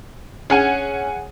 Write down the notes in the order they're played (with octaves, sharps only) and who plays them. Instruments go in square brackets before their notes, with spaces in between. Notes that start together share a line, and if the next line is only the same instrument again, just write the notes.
[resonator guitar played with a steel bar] C#4 [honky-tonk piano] G#4 F#5 G#5